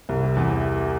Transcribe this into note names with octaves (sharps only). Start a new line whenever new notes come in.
C2
C3
E2